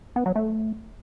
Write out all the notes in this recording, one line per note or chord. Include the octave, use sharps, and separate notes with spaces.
B3
F#3
A3